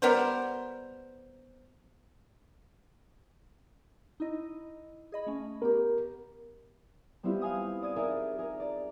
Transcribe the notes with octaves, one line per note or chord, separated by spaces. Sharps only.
G3 B3 A#4 C5
D#4 E4 D#5
G#4 D#5 B5
A3 C#4
B3 G4 A#4
G3 B3 C4 E4 F4 G4
F5 G#5 D#6
D5 D#6 G#6 D#7
D#4 G#4 A#4 D5 E5
G#4 A#4
D5 A#5